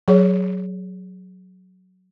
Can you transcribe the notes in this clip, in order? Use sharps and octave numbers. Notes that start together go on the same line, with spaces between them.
F#3 G#4 C#5